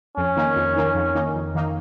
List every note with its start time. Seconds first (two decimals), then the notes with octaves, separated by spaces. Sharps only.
0.17 F2 C#4
0.36 D#3 A#3 D#4
0.56 F2
0.77 D#3 A#3 D#4
0.95 F2
1.15 D#3 A#3 D#4
1.35 F2
1.55 D#3 A#3 D#4